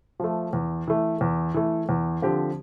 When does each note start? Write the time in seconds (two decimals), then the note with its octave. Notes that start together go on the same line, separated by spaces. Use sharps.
0.20 F3 A3
0.53 E2
0.88 E3 A3
1.21 E2
1.54 E3 A3
1.89 E2
2.22 D3 F3 C4 G4